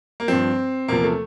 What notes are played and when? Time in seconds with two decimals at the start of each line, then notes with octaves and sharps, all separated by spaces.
0.20 A#3
0.28 G2 F3 C4
0.88 E2 C3 F3 A#3
1.04 A3